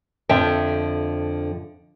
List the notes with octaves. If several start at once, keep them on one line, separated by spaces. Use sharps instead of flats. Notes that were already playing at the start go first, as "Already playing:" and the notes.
F2 D3 E5 G5